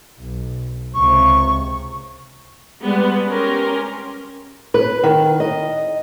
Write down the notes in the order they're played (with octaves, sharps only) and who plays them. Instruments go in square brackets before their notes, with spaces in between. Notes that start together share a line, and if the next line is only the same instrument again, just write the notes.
[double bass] B1
[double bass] C#2 C3 [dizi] C#6
[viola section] G3 G#3 B3
C#4 G4 A#4 C6
[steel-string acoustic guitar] B4
D#3
D#5